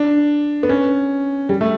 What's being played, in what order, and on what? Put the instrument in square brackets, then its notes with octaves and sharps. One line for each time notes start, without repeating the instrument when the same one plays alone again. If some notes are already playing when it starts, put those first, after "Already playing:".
Already playing: [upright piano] D4
B3
C#4
G3
A3